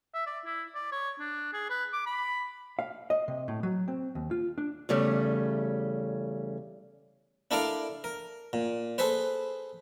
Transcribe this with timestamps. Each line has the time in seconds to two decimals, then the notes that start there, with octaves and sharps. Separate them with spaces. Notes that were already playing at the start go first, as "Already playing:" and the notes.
0.14 E5
0.27 D5
0.45 E4
0.75 D5
0.92 C#5
1.19 D4
1.53 G#4
1.70 B4
1.93 D6
2.06 B5
2.79 F5
3.10 D#5
3.28 C3
3.48 A2
3.63 F#3
3.88 C4
4.15 D#2
4.31 F4
4.58 D4
4.89 E2 C#3 G3 A3 C#4
7.51 D4 E4 A4 A#4 D5 F5
8.04 A#4
8.53 A#2
8.98 G#4 A4 B4 C5